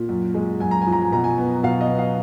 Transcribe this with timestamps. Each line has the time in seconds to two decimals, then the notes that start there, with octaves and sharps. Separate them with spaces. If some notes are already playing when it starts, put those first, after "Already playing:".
Already playing: A#2
0.09 F#2
0.34 G#3
0.60 F#2 G#5
0.71 A#5
0.82 G#5
0.87 F3
0.92 A#5
1.02 G#5
1.12 B2 A#5
1.24 G#5
1.38 B3
1.63 B2 F5
1.81 D#5
1.90 B3
1.99 F5